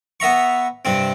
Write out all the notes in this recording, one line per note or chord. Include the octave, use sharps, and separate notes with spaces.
B3 E5 A#5 C#6
G2 C3 C4